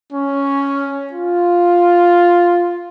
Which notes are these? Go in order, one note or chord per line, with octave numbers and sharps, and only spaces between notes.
C#4
F4